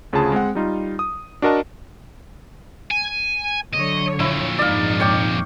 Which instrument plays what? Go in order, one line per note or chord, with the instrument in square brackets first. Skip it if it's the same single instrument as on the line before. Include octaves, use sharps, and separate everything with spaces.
[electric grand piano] D2 C#3 F4 G#4 A5
G#3 C4 F#5
G3 D#4 F4
D#6
D4 F#4 A#4 D#5 A5
[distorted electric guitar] G#5
[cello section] D3 F#3 C#5 [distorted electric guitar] D#5
[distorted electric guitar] F2 A#2 [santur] E4
[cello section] G#2 D#4 [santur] D5 F5
[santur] C#5 G5 D6